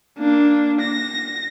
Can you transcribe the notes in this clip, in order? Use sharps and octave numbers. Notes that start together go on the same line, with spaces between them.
A#3 D4
A#6